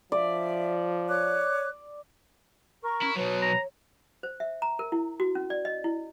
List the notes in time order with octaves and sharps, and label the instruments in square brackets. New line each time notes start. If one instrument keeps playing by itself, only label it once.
[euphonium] F3 [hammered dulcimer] D5 [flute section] E5
[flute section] C#5 D6 F#6
A#4 C#6
[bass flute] C#4 [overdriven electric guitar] E4
[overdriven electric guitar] B2 F#3 [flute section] B4 [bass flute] C#5
[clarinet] A#5
[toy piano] C5
E5
A#5
A#4
E4
F#4
C#4
D5
D#5
E4